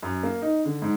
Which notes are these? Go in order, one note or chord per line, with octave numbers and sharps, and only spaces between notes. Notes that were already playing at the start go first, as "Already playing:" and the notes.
F#2
A#3
D#4
D3
G#2